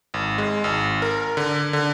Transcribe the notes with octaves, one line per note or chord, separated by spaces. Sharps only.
G#1
G#3
G#1
A#4
D3
D3